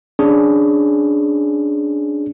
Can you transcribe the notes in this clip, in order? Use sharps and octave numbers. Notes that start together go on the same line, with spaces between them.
C#4 D4 G#4